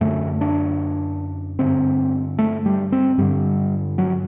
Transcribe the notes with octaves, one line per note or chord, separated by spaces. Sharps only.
F#2 D3 A3
D4
G2 D3 C4
A3
G3
C4
G2 D3 G3
F#3